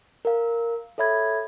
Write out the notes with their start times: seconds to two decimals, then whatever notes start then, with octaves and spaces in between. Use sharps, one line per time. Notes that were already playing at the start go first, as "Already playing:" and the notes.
0.25 A#4 F5
0.98 A4 C#5 E5 B5 G#6